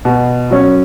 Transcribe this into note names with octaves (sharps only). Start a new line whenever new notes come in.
B2
F#3 C#4